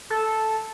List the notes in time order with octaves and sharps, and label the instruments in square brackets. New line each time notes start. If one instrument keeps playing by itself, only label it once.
[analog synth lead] A4